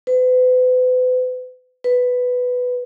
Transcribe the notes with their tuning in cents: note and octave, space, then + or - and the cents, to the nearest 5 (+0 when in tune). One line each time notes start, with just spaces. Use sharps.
B4 +40
B4 +5